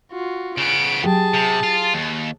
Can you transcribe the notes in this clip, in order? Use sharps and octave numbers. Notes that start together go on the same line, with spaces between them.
F4 F#4
C#3 B3 D7
F#3 G4 G#4 G5 A5
C3
F4
D#2